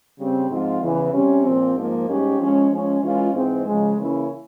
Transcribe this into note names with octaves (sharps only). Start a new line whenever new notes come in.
C#3 G3 C4
G#2 F3 C4 F4
E2 C#3 E3
C3 G3 C#4
A#2 F3 C4
G#2 F3 A#3
G#2 G3 C#4 G4
F3 G#3 C#4
F3 G#3 C#4
E3 G#3 C#4 F4
G#2 E3 G#3 C4
C#3 F3 G#3
C#3 E3 A#3 C#4 E4